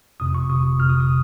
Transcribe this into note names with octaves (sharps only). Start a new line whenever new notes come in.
G1 F2 C3 D#6
C#6
G1 F2 C3 D#6
G1 F2 C3 F6
D#6
D#6